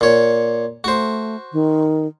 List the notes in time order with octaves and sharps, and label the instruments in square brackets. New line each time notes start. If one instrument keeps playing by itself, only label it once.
[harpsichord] A#2 C#5
[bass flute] A3 [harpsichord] F#4 C5
[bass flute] D#3